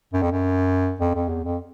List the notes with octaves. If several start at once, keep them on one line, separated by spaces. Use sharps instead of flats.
F#2
F2
F#2
F2
F2
E2
F2